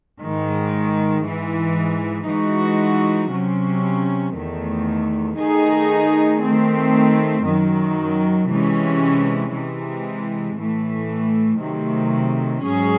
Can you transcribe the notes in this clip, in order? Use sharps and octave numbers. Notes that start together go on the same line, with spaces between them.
G#2 D#3 G#3
G#2 E3 G#3
E3 G#3 D#4 F#4
C3 F#3 C#4
E2 D#3 A3
D#3 A3 D#4 G#4
D#3 A3 C4
F#2 D#3 F#3
C3 E3 G#3 C#4
C3 E3 G#3
A2 E3 A3
C3 D#3 F#3 A3
G#2 F#3 C#4 G#4